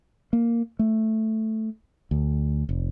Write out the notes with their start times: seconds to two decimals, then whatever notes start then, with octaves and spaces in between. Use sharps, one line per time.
0.33 A#3
0.79 A3
2.11 D2
2.69 F1